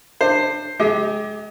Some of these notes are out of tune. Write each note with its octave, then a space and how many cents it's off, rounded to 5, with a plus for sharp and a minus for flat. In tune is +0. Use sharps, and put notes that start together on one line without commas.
D4 +30 C5 +5
G#3 +35 G4 +0 D#5 +35